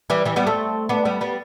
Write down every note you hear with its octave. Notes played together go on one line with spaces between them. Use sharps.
E3 G3
E3 G3
G3 B3
A3 C4
B3 D4
G3 B3
G3 B3